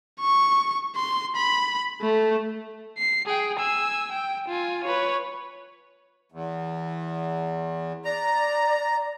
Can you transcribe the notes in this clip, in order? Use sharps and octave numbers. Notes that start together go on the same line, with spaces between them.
C#6
C6
B5
A3
C7
G#4 G5
G#5 E6
G5
F4 G#5
B4 C#5
E2
D5 A#5